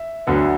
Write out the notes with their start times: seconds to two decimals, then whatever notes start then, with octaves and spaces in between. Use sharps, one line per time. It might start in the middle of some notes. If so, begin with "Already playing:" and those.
Already playing: E5
0.27 D2 D3 F#3 B3